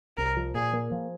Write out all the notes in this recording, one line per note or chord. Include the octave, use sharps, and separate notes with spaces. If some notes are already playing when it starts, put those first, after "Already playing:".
C2 A#4
F3
A#2 G#4
A#3
F3